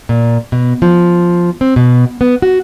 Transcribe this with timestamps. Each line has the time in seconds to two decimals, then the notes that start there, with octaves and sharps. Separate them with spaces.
0.09 A#2
0.52 B2
0.82 F3
1.61 C4
1.76 B2
2.21 B3
2.42 F#4